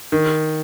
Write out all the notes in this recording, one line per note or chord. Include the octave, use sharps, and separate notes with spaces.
D#3